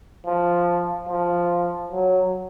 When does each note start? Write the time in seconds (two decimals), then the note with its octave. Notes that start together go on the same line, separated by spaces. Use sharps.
0.27 F3
1.09 F3
1.92 F#3